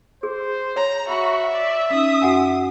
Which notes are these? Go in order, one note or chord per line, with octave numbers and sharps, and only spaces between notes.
G#4 C5
C#5 A#5
F#4 E5 B5 C#6
D5
C#4 D#4 D#6
F#2 F#4 F#5 G#5